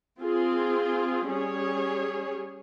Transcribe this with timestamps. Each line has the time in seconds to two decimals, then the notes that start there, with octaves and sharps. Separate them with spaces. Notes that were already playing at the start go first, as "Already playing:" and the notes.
0.20 C4 F4 G#4
1.28 G3 C#4 G#4 C#5